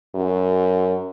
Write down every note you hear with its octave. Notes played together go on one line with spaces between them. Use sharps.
F#2